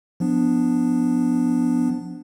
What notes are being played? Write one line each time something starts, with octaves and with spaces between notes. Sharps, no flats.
F3 B3 D4